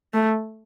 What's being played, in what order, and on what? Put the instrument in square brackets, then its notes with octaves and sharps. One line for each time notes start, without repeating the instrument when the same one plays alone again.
[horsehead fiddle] A3